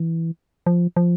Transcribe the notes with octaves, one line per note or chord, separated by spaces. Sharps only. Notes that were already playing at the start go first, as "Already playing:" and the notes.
Already playing: E3
F3
F3